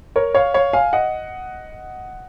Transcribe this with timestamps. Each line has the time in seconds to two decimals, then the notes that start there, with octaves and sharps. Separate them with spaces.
0.16 A#4 C#5
0.35 C#5 F5
0.54 C#5 F5
0.73 F5 G#5
0.93 D#5 F#5